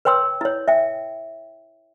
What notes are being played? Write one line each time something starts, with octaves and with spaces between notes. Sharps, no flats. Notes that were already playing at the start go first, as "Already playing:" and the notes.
B4 C#5 G5 C6 E6
E4 C#5
E5 G5